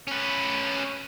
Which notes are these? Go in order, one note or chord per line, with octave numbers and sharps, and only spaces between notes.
C#4 B4